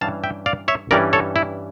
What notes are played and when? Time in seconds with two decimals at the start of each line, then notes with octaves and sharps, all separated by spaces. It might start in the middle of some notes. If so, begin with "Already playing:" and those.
0.01 G2 E3 G3 C#4 F5 A5
0.24 E5 G5
0.46 D5 F5
0.68 C#5 E5
0.91 G2 E3 G3 C#4 A#4 D5
1.13 A4 C#5
1.36 E4